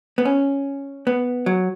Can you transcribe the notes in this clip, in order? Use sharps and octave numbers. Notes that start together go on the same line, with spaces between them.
B3
C#4
B3
F#3